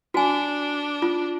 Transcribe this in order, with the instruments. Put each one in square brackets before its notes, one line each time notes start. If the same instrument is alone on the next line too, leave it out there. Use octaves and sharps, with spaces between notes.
[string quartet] D4 [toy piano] F#4 G#5
[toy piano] F4